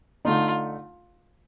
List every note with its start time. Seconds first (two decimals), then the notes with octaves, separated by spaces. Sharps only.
0.25 D3 A3 D#4 F4